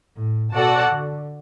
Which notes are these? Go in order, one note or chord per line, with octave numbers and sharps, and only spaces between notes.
A2
B2 F#4 A4 D5 F#5 A5
D3